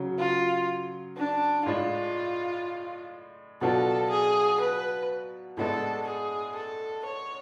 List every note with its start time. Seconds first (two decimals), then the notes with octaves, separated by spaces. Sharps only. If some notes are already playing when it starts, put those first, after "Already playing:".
Already playing: C#3 F#3 C#4
0.19 F4
1.17 D4
1.66 A2 G#3 D4 F4
3.61 B2 F#3 B3 D4 F4 A4
4.11 G#4
4.60 B4
5.57 A2 G#3 B3 D4 A4
6.07 G#4
6.55 A4
7.05 C#5